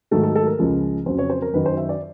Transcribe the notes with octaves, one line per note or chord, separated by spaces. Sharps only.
G#2 D#3 F#3 A3 A4
A4
A4
A#4
C#2 C#3 F3 G#3
F2 C#3 F#3 C5
C#5
C5
A#4
F#2 D#3 F#3 B4
C5
E5
D5